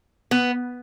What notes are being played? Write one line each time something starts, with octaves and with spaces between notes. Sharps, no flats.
B3